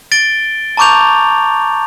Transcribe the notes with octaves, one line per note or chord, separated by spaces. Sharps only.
A6 D7 G7
A5 A#5 C#6 D6 G6 F7